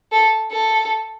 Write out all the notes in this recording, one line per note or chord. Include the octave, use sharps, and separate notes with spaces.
A4
A4